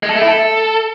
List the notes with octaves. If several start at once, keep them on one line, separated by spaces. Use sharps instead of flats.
G#3
A4
A3
E4
A4